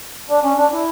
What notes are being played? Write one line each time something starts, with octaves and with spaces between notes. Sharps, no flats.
D4
C#4
D4
E4